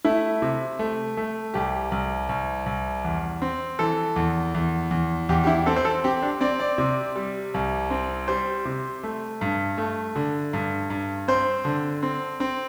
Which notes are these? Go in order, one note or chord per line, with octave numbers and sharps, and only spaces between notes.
A3 E4
C3
A3
A3
C2 G4
C2
C2
C2
E2
C4
E3 A4
E2
E2
E2
E2 G4
G4
E4
C4 A4
C5
A4
C4 G4
D4
C4 D5
D5
C3
G3
C2
C4
G3 C5
C3
A3
G2
A3
D3
G2
G2
C4 C5
D3
C4
C4